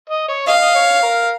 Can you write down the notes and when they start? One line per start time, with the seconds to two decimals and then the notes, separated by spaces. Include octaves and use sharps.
0.10 D#5
0.28 C#5
0.47 D#5 F5
0.61 D#5
0.75 C#5
1.03 A#4